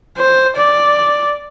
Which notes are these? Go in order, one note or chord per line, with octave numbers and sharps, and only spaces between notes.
C5
D5